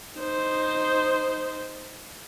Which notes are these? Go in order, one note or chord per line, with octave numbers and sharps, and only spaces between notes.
D#4 C5